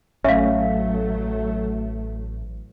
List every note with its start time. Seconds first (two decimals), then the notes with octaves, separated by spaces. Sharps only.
0.24 A1 F#3 A3 C#4 E5 F5